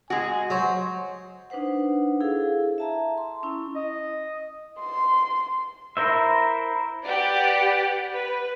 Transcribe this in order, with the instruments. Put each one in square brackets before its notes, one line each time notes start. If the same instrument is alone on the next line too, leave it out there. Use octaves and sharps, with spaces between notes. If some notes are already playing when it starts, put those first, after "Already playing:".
[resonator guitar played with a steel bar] G#3 F#4 [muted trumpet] G#5
[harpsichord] F#3 [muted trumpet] C5
[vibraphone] D4 D#4 B4 C5 F#5
E4 G#4 A4 F5
E5 A5 A#5
C6
C#4 E4
[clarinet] D#5
[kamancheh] C6
[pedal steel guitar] E4 A#4 C5 E5
[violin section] G4 B4 D5 F#5
B4